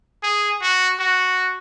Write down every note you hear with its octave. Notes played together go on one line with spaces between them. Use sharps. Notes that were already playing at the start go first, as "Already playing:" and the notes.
G#4
F#4
F#4